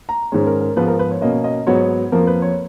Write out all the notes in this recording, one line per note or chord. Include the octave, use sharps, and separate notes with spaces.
A#5
G#2 D#3 G#3 C#4
A#4
A#4
G#2 F3 G#3 B3 B4
A#4
B4
C#5
B2 A#3 C#4 D#5
D#5
G#2 F#3 B3 C#5
F2 F3 A#3 A#4
B4
C#5